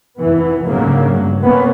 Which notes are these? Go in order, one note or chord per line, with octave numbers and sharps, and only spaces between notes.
F1 E3 B3
D2 G#2 C#3 F#3 A#3
G2 F#3
C3 A#3 B3 C#4